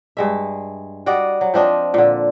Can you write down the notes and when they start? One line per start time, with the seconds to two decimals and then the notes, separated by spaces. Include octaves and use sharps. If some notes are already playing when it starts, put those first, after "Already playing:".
0.17 G2 G#3 E5
1.06 G3 F#4 D5 D#5
1.41 F#3
1.54 F3 C4 D4 D#5
1.94 A#2 D3